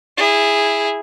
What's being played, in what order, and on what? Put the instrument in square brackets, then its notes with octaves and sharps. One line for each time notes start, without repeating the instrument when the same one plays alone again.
[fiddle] E4 G#4